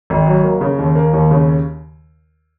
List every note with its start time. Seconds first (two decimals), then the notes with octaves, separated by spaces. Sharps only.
0.10 G#1
0.27 F#3
0.44 A#3
0.61 C#3
0.79 D#2
0.95 A#3
1.13 D#2
1.31 C#3